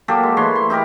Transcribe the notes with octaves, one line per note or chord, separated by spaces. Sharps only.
F#3 A#3 G4 A4
G#3
E3 A3 C#5 C6
C6
D#4 E4 G4 A#4